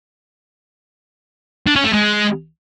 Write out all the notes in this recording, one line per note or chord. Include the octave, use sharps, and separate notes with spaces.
D4
C#4
A3
G#3